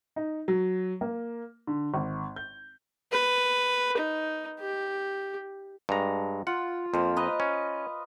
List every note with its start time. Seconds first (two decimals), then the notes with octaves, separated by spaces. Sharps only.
0.16 D#4
0.48 F#3
1.01 A#3
1.67 D3
1.94 G#1
2.36 G6
3.12 B4
3.97 D#4
4.60 G4
5.89 G2 G#3 A#5
6.47 F4 F#5
6.94 F2 A#3 C5
7.16 B4 D#5 A#5
7.40 C#4